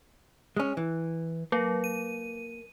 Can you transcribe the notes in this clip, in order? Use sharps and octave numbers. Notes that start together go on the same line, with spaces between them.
G#3 C#4
E3
F#3 A#3
D#7